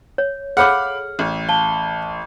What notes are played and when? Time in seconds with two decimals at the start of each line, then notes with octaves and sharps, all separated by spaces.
0.18 C#5
0.57 G#4 A4 C#5 F5 F#5 B5 D6 F6
1.19 A1
1.49 F5 A5 G7